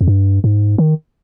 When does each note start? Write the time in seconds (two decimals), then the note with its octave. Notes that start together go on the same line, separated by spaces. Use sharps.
0.01 F2
0.08 G2
0.44 G#2
0.78 D#3